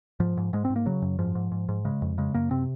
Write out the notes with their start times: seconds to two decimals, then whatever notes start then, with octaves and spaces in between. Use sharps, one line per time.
0.20 G#2 F3
0.37 G#2
0.53 G#2 G#3
0.65 C4
0.70 G#2
0.76 A#3
0.86 C#3 F#3
1.02 F#2
1.19 G#2 F3
1.35 G#2
1.52 G#2
1.69 G#2
1.85 C#3 G#3
2.02 F2
2.18 C#3 G#3
2.34 F#2 A#3
2.51 C3 C4